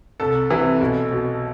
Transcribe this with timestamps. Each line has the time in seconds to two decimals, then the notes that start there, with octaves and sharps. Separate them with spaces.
0.20 C2 A4
0.50 C3 E3
0.81 B1
1.12 B2